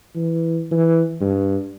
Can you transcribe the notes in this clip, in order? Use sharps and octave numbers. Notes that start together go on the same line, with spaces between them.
E3
E3
G2